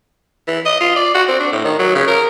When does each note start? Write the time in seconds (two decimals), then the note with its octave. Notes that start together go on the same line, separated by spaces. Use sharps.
0.48 E3
0.65 D#5
0.80 F4
0.96 D5
1.14 F#4
1.28 C4
1.40 D4
1.52 A2
1.64 D#3
1.79 F#3
1.95 C#3
2.08 A#4